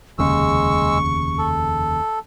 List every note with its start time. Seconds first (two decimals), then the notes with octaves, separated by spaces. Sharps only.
0.19 F1 D#2 C#3 G#3 C#6 E6
1.39 A4